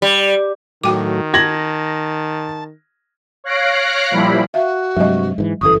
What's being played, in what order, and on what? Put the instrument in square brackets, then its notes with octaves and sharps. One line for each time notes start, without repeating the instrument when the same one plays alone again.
[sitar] G3
[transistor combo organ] A2 F#3 [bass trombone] D#3 [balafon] F#4 G5 D6
[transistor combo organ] A5 [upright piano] G#6 A#6 F#7
[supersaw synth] C#5 F5 F#6 A#6 C7 D7
A#2 F3 G3 E4 B5
[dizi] F#4 [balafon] E5 F5
[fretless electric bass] G2 C3 [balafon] F#3 G#3 D#5
[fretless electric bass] G#2 D#3 E3
[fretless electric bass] G1 F#2 E3 [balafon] A4 C#6 [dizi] D#6